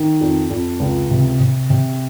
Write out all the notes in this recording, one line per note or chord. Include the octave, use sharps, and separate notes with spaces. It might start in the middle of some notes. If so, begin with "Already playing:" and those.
Already playing: D#3
F2
F2
C#2
C3
C3
C3